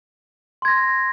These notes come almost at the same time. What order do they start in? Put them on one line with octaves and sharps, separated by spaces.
C6 G#6 A#6